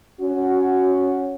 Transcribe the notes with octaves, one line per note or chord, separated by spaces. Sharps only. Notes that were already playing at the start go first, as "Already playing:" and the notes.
C#4 F#4